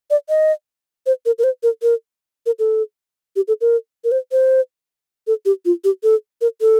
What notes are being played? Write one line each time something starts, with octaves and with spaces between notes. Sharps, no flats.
D5
D#5
C5
A#4
A#4
C5
A#4
A#4
A#4
A4
G4
A4
A#4
A#4
C5
C5
A4
G4
F4
G4
A4
A#4
A4